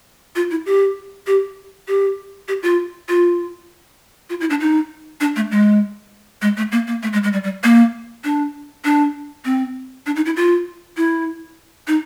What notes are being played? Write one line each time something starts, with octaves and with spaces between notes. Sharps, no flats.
F4
E4
G4
G4
G4
G4
F4
F4
F4
E4
D4
D#4
D4
A3
G#3
G#3
A3
A#3
A#3
A3
G#3
G#3
G3
G3
A#3
D4
D4
C4
D4
D#4
E4
F4
E4
D#4